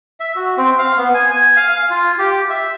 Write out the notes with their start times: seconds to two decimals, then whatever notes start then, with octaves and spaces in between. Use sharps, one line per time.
0.20 E5
0.36 F#4
0.57 C4
0.78 F5
0.97 B3
1.14 G#5
1.31 G#5
1.56 F5
1.69 F5
1.90 F4
2.19 G4
2.50 E5